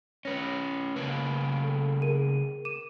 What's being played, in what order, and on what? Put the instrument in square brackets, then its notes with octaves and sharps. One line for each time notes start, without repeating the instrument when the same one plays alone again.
[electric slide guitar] C#4 B4 [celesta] C#5 A#6 C#7
[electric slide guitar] C#3 A#3 B4
[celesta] A4
G#4 A#4 D#7
D6 D#7 E7